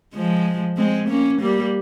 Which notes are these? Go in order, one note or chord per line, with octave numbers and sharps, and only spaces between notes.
F3 G#3
G#3 C4
A#3 C#4
G3 A#3